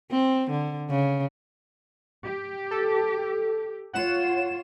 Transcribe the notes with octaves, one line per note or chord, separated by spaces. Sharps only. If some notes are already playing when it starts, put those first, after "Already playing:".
C4
D3
C#3
G4
A4
F4 C#5 F#5 E7